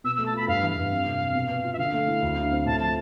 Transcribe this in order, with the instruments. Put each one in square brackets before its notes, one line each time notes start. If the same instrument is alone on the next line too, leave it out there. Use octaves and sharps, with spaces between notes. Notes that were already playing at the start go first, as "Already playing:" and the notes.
[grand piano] B2 [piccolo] E6
[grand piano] A3 [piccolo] E6
[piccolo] A5
[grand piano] F4 [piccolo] B5
[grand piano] G2 [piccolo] F5
[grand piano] E3
[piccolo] F5
[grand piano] G2
F2
C3
F2
B2
B3
F4
[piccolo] E5
[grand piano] D3 [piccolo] F5
[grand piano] A3
E4
D2
D3
C4
[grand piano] A2 [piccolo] A5
[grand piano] F3 [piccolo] A5